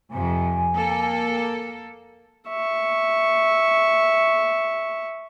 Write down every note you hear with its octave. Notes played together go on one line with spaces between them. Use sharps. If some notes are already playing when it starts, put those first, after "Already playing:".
F2 C3 G#5
A#3 A4
E5 C#6